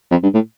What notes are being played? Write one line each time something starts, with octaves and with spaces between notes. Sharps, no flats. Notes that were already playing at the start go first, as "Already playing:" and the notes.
F2
G2
A2